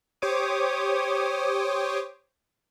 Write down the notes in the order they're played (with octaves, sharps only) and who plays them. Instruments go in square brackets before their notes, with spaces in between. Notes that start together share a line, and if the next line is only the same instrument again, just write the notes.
[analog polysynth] G4 C5 C#5 D6 D#6